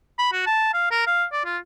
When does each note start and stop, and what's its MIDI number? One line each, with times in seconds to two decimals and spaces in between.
0.19 0.32 83
0.32 0.45 66
0.47 0.72 81
0.74 0.89 77
0.92 1.06 70
1.07 1.25 77
1.33 1.42 74
1.45 1.58 65